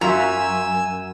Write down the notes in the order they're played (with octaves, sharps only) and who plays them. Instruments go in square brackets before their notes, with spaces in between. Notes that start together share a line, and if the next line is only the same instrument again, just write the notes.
[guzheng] F#2 [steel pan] F4 F#4 E5 [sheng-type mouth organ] G#5 E6 [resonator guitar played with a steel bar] A#5